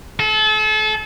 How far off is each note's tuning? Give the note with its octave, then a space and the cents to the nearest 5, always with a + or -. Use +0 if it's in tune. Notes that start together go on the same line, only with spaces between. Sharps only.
A4 -35